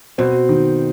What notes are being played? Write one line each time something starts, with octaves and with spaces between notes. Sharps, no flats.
B2 C4
D#3